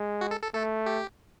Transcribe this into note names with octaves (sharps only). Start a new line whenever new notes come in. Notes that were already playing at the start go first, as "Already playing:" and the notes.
Already playing: G#3
F#4
A4
A4
A3 A4
G4